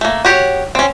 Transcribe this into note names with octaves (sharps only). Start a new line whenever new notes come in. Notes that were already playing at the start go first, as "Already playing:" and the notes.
A3 A#3
F#4 G4 C#5
C4 C#4